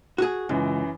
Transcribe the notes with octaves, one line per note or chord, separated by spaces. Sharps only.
F#4 G#4
C#2 F#2 E3